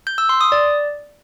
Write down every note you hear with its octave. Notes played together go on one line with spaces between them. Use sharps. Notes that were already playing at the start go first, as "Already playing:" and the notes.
G6
E6
C6
D#6
D5